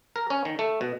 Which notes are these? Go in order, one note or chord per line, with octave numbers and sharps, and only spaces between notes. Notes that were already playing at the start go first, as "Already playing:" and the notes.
A#4
C#4
D#3
A3
B2